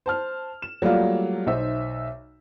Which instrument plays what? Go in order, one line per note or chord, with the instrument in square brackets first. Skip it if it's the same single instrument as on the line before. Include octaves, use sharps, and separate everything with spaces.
[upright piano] C5 A5 F6
E7
F#3 G3 A3 A#3 F4
B1 D#4 C5 E5